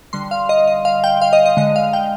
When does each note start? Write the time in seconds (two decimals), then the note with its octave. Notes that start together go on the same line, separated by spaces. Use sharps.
0.13 D3 G3 C6
0.31 F5
0.49 D#5
0.68 D#5
0.85 F5
1.04 G5
1.22 F5
1.33 D#5
1.46 D#5
1.57 D3 G#3 D#5
1.76 F5
1.93 G5